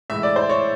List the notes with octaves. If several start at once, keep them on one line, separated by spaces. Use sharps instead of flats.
A2 E3 G#3 E5
D5
C5
C#5